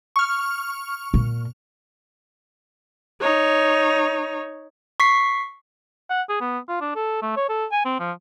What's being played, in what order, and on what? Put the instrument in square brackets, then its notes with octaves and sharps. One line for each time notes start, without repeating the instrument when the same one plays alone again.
[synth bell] C#6 F6
[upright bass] A#2
[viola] D#4 C#5
[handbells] C#6 B6 C7
[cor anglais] F#5
G#4
B3
F4
D4
A4
A3
C#5
A4
G#5
C4
F3